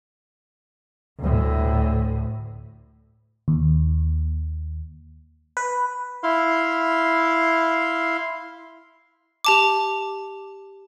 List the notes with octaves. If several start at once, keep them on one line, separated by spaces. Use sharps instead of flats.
D2 A2
D#2
B4
E4 F5 C6
G4 A5 D6